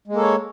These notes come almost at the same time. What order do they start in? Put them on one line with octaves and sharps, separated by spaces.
G#3 A#3 A4 C#5